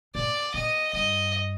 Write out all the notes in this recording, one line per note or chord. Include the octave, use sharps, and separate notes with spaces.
A#2 D5
A#2 D#5
G2 D#5